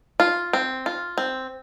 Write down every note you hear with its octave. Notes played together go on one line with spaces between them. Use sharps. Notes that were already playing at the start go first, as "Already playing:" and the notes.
F4
C4
F4
C4